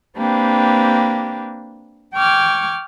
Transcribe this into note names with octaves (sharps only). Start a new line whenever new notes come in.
A#3 C4 D4 G4 B4
G5 C#6 D6 F6 G#6